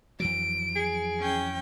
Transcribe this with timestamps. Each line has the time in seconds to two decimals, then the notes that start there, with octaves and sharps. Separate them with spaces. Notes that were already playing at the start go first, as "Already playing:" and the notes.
0.20 F2 E3 F#3 D7
0.76 G#4
1.19 C#4 G5